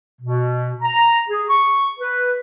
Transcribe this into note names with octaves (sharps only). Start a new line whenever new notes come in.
B2
A#5
G#4
C#6
B4